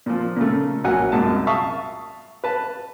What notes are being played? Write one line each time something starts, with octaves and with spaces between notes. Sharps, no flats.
A#2 F3
A#2 C#3 A3
A#1 F#3 A#3 F#5 G#5
C2 F#2 A#2 G#3 A5
E5 F5 A5 C#6 D#6
B4 A5